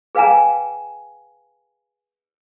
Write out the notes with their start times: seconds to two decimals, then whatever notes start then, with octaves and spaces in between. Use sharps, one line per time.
0.15 G#4 B4 F5 G5 G#5 A#5